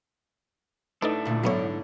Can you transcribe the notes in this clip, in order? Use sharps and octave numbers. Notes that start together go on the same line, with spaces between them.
A2 A3 D4 D#4 A4 B4
D2 A#2
G#2 D3 F#3 B3 E4 C#5